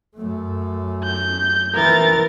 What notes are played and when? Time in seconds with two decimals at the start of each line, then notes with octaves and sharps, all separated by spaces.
0.15 F#2 A3
1.03 G6
1.74 E3 A#4 A6